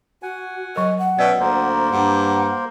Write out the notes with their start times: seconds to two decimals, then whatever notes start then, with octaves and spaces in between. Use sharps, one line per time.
0.23 F#4 F#5 G#5
0.76 F#3 A#4 D#5
0.99 F#5
1.19 B2 C#4 D5 E5
1.40 D2 A#3 A#4 C5
1.91 G2 F#5